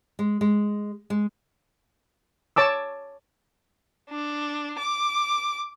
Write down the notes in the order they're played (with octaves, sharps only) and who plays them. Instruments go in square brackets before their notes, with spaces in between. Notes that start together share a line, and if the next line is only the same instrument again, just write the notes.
[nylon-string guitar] G#3
G#3
G#3
[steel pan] C#5 A5 D6 E6
[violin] D4
D6